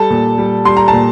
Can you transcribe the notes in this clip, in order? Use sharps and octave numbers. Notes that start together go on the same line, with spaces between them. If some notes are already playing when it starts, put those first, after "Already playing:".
Already playing: G3 A4 A5
A#2
G3
G3 C6
A#5
A5
A#2